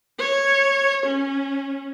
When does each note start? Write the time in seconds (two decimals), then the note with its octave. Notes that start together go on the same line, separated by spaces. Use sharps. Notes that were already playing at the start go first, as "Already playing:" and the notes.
0.19 C#5
1.06 C#4